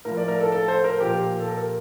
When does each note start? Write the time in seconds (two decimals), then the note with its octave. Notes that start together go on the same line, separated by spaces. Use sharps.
0.05 A2 F3 A#4
0.17 D5
0.28 A#4
0.41 A4
0.52 A4
0.68 C5
0.84 A#4
1.00 A#2 F3 G4
1.40 A4
1.48 A#4